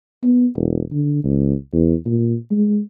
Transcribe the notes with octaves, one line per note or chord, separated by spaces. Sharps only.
B3
E1
D3
C#2
E2
A#2
G#3